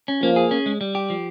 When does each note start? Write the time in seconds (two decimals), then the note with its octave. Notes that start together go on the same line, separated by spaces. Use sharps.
0.08 C#4
0.22 F3 A#3
0.36 G#4
0.51 C#4
0.66 G#3
0.81 G3
0.95 G4
1.10 F3